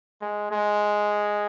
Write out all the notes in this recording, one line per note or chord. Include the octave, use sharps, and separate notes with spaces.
G#3
G#3